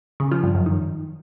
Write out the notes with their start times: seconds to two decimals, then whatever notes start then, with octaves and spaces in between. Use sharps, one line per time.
0.20 C#3
0.31 F3
0.43 G2
0.55 F#2
0.66 D#3